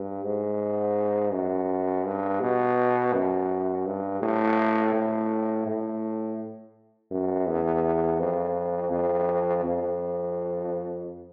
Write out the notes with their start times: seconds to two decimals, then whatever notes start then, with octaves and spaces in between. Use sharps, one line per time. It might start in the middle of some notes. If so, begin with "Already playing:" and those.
Already playing: G2
0.25 G#2
1.33 F#2
2.06 G2
2.41 B2
3.14 F#2
3.86 G2
4.22 A2
4.93 A2
5.66 A2
7.11 F#2
7.46 E2
8.20 F2
8.91 F2
9.64 F2